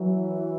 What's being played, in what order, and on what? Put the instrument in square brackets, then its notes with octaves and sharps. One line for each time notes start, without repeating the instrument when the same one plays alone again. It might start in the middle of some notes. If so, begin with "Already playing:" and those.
Already playing: [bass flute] E3 [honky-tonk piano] F#3